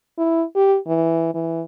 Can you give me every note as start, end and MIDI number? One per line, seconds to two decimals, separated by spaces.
0.18 0.44 64
0.55 0.77 67
0.87 1.33 52
1.34 1.62 52